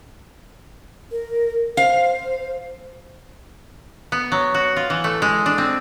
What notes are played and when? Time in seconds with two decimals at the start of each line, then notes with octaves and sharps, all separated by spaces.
1.11 A#4
1.77 C5 F5
4.12 B3
4.32 F#3
4.54 F#4
4.77 F4
4.90 E3
5.04 A3
5.22 G#3
5.46 D4
5.58 C4